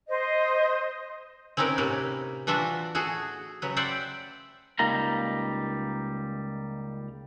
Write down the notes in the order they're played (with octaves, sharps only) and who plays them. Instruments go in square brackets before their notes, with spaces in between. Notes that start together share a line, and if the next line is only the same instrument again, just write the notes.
[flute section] C5 D#5
[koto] C4 C#4 D#4 E4 A#4 B4
A2 C3 A#3 C#4 B4
E3 D4 F4 F#4 E5
A3 F#4 G#4
C#3 F#3 B4
C5 D5 E5 F#5 G5
[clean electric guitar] C#2 G3 A#3 D#4 A#5